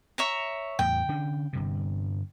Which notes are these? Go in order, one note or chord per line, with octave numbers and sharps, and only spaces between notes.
C#5 E5 A#5
E2 A2 G5
D3 C#4 D4
G1 G2 C3